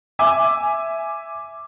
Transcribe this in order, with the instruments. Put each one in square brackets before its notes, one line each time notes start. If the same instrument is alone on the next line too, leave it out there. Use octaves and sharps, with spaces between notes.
[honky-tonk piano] E5 G#5 D6